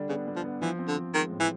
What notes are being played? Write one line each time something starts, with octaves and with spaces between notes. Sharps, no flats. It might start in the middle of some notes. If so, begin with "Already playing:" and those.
Already playing: D3 G3 D4
C#3 B3
G3
F3
B3
E3 F3
C4
D3
F3
D#3 G#3
A2
E3